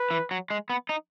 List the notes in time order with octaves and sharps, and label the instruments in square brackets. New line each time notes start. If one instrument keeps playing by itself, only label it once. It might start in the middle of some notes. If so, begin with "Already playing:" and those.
Already playing: [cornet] B4
[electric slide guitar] E3
F#3
G#3
B3
D#4